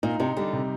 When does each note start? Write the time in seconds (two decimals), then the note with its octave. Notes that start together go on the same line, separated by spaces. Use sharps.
0.03 A#2 D#4
0.20 C3 D#4
0.37 D3 G3
0.53 C3